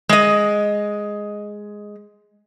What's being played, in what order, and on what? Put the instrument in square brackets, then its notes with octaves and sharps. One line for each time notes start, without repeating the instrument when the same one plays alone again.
[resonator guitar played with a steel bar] G#3 D#5